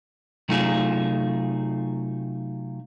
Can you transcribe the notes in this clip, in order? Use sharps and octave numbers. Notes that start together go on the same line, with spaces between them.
C3 F#3 A3 D#4 F4 G#4